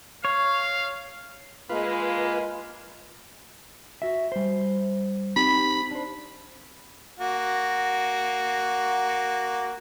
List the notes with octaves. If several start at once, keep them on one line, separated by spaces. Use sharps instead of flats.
C#5 F5
G#3 A#3 F4 B4
F#4 E5
G3 C5
C4 D#4 G4 B5
D4 C5
A#3 F#4